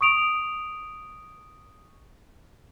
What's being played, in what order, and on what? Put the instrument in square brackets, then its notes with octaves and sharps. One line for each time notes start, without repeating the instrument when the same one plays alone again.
[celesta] C#6 D#6 D7 F7